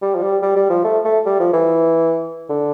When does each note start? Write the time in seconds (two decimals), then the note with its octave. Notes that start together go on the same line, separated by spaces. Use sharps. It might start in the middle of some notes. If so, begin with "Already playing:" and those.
0.02 G3
0.15 F3
0.22 G3
0.42 G3
0.56 G3
0.70 F3
0.84 A3
1.05 A3
1.26 G3
1.40 F3
1.53 E3
2.49 D3